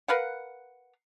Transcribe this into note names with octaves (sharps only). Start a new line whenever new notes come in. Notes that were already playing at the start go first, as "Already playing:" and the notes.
A#4 B4 F5 F#5